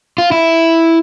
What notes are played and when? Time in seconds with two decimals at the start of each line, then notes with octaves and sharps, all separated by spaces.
0.18 F4
0.32 E4